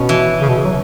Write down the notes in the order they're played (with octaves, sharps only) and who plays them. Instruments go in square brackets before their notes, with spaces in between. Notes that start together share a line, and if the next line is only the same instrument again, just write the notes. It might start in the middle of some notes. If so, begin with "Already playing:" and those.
Already playing: [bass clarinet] B2 [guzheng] B3 C#4
[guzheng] E3
[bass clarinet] C#3
B2
C#3
F#3